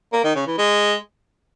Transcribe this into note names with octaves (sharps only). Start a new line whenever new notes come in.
A#3
D#3
C#3
E3
G#3